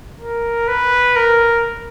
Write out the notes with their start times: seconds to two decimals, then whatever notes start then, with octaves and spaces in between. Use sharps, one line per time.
0.21 A#4
0.68 B4
1.16 A#4